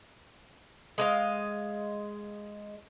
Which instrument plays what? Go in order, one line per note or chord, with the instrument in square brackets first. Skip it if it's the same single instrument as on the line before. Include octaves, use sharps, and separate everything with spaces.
[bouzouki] G#3 D#5 F5